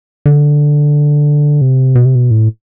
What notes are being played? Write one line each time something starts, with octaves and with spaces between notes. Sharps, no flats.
D3
C3
B2
C3
B2
A2